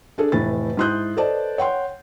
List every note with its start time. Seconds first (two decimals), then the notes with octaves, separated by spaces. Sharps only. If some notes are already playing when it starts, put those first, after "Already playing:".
0.18 D4 G#4 A4
0.32 F1 A2 E3 B4 A6
0.77 G#2 E4 C6 D#6 F#6 G6
1.17 A4 B4 C5 D5 D#5 A5
1.58 C#5 F#5 G5 C6